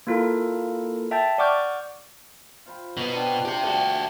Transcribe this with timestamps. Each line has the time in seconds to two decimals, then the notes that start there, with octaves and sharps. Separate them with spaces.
0.07 A#3 E4 F4 A4 A#4
1.11 E5 G5 A5 G6 A6
1.38 D5 F#5 C#6 D6 F6 G6
2.66 F4 C5 B5
2.97 B2 B3 D#4
3.12 C4 D4 F4
3.45 C3 G4 C5 C#6
3.64 A3 D4 F#4 A4 G5